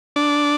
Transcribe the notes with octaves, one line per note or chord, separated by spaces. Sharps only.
D4